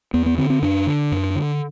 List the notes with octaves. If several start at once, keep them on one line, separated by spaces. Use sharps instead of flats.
E2 B3
B3
D3 C4
C4
F#2 D4
D3
F#2
D3